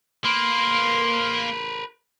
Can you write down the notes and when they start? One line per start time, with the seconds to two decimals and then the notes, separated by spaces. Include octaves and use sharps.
0.25 A#3 A#4 B4 C6